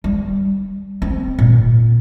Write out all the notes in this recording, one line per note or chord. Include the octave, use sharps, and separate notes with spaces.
G3
C4
A#2